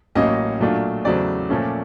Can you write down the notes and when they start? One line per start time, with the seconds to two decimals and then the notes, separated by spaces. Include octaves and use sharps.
0.15 A1 A2 F#3 A#3 C#4 D#5
0.60 A#2 F#3 A3 D4 F4
1.05 E2 C#3 F#3 A3 C4 D5
1.50 A#2 F3 A3 C#4